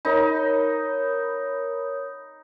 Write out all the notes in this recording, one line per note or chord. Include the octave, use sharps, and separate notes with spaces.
D#4 A#4 C#5 B5